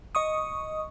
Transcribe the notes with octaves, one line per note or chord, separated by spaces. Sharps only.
D#5 C#6 D#6